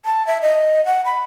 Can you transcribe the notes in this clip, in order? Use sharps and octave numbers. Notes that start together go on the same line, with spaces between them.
A5
E5
D#5
F#5
B5